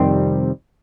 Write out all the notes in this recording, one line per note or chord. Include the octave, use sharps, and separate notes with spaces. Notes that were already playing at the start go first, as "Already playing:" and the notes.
Already playing: F2 C3 D#3 G3 C4